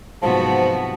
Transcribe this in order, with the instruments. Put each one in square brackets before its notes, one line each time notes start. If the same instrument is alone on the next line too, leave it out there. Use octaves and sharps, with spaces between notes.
[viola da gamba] G#2 B3 F#4 [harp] C3 F#3 C4 [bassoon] F3 [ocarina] A5